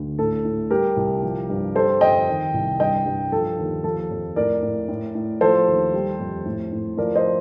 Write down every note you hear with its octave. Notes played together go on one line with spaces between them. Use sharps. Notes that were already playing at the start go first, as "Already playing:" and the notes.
Already playing: D2
A2 A4
A2
G3 G4 A#4
C2
F3
G2
G3 A4 C5
F2 D#5 G5
D#3
C2
G2 D#5 G5
G2
F3 A4
D#2
F3 A4
F2
A2 A#4 D5
A2
A2
A2
F3 A4 C5
D#2
G3
F2
A2
A2
F3 A#4 D5
C5 D#5